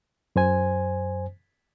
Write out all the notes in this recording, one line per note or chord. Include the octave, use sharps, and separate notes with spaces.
F#2 C5 G#5